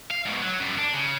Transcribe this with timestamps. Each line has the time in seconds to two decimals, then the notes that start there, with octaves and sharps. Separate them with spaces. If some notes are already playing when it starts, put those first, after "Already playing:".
0.11 F5
0.26 G#2 B2
0.42 F#3
0.59 F#2 G3
0.78 D4
0.93 C#3